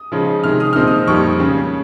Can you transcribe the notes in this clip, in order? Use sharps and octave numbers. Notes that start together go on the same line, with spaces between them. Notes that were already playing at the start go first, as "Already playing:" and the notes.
Already playing: D#6
C#3 F3 G#3 D#4
C3 D#3 G#3 F6
D#6
A#2 F3 C4 D#4 F6
D#6
F2 D#3 G3 A#3 C#6
C#3 G#3 C#4